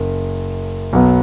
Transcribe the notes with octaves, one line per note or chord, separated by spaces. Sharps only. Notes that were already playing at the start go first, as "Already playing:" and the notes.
Already playing: F#1 F#2
B1 B2 F#3 B3